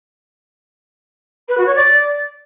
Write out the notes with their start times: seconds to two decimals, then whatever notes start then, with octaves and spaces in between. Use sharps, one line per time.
1.48 B4
1.57 F#4
1.66 C#5
1.75 D5